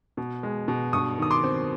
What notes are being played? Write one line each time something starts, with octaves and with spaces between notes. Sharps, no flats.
B2
G#3
B2
G2 C#6 D#6
D#3 D#6
C6 D6
C4